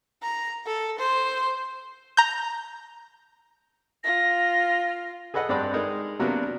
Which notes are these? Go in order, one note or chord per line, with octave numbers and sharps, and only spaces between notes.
A#5
A4
C5
A#5 G6
F4 A#6
G#4 A4 B4 D#5 F#5
G2 C4 D4 D5 B5 F#6
G#3 D#4 A#4
C3 F#3 A#3 B3 D4